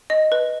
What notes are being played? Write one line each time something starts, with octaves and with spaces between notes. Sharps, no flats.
D#5
B4